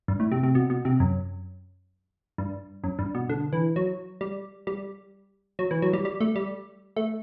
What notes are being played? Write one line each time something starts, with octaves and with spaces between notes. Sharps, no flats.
G2
A2
C3
C3
B2
B2
C3
F#2
G2
F#2
G2
B2
D3
E3
F#3
G3
G3
F#3
E3
F#3
G3
G3
A3
G3
A3